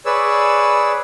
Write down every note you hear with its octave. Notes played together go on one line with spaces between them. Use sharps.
G#4 B4 C#5 D5 E6